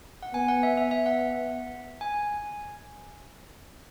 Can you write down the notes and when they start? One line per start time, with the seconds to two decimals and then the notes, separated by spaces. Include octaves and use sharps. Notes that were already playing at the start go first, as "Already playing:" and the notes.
0.23 F#5
0.34 B3 G#5
0.48 F#5
0.63 E5
0.77 B3 E5
0.91 E5
1.06 F#5
2.01 G#5